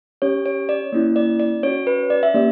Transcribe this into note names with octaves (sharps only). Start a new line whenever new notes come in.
C#4 G4 C#5
C#5
D5
A#3 C#4 E4
D5
D5
C#4 F#4 C#5
B4
D5
E5
A#3 C#4 G4 D5